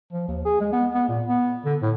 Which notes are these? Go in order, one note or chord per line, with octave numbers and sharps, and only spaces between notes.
F3
D#2
G#4
G#3
B3
B3
A#2
B3
D3
A2